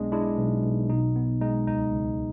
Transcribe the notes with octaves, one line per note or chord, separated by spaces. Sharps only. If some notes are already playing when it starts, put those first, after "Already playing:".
Already playing: B1 G#3 B3 D4
G#3 D4 E4
B1
B1
B2 D#4
B3
G#3 D#4
C#2 D#4
C#2